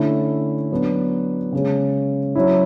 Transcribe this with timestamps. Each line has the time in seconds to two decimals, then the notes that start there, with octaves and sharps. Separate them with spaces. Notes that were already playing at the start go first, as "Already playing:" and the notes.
Already playing: D3 A3 C#4 E4
0.72 F#3 B3 D4
1.53 C#3 G#3 C#4
2.35 F#3 C#4 E4